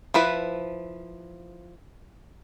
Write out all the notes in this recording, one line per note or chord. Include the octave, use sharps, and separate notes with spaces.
F3 E4 B4